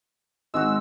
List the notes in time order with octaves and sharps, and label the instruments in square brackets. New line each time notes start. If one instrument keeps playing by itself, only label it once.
[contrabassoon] G#1 [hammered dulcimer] G#3 F#4 [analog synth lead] E6